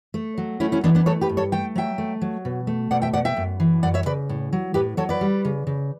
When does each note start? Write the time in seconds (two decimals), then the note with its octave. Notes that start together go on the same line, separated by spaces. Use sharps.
0.14 A3
0.38 F#3
0.60 A3 C#4 E4
0.72 C#4 E4
0.84 E3 B3 D4
0.95 B3 D4
1.06 A3 A4 C#5
1.21 G4 B4
1.29 G2
1.37 A4 C#5
1.52 A3 G5
1.75 F#3 E5 G5
1.98 A3
2.22 F#3
2.45 B2
2.67 A3
2.91 B2 D5 F#5
3.02 E5 G5
3.13 B2 D5 F#5
3.25 E5 G5
3.37 F#2
3.60 E3
3.83 F#2 D5 F#5
3.94 C#5 E5
4.06 C#3 B4 D5
4.29 A2
4.53 F#3
4.74 A2 G4 B4
4.97 F#3 A4 C#5
5.09 B4 D5
5.21 G3
5.45 C#3
5.67 C#3